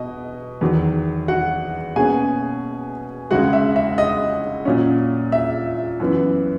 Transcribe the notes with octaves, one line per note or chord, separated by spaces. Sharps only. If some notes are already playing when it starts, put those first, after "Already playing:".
Already playing: B2 D#5
E2 D#3 F#3
F#4 F#5
B2 A#3 C#4 G#4 G#5
C#2 C#3 G#3 F#4 F#5
E5
E5
D#5
A#2 F#3 C#4
E5
F#2 E3 B3